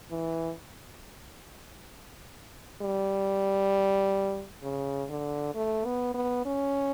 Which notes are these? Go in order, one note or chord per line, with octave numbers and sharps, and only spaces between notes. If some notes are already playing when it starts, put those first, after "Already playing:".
E3
G3
C#3
D3
A3
B3
B3
C#4